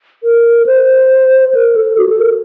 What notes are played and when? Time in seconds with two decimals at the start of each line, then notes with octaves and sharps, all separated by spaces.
0.24 A#4
0.66 C5
1.55 A#4
1.76 A4
1.98 F#4
2.09 A4
2.20 A#4